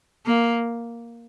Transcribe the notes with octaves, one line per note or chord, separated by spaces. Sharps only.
A#3